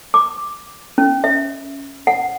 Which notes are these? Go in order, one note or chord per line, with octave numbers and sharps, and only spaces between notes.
D6
C#4
E5
F#5